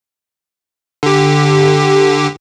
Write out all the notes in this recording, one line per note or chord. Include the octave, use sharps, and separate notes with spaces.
D3 G4